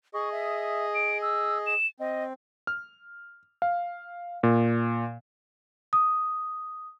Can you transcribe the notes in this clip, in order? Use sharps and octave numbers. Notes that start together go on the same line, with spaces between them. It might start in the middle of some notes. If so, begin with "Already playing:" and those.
G#4 D#5 C#6
E5
D7
E6
E7
C4 D#5
F6
F5
A#2
D#6